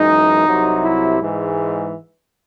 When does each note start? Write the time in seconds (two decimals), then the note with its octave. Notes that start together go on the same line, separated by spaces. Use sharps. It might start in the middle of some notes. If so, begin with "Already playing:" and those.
Already playing: F#2 E3 G#3 D#4
0.47 C2 C3 F#3
0.83 E4
1.20 G#2 E3 G#3